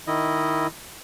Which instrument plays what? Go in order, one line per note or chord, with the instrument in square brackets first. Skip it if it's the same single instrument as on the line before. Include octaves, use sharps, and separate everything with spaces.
[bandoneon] D#3 E4 D#5